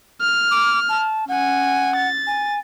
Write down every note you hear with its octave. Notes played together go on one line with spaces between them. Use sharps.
F6
D6
A5
C#4 F#5 G#5
A6
G#5